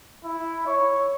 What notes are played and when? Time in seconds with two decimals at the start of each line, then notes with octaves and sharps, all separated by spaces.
0.25 E4
0.67 C#5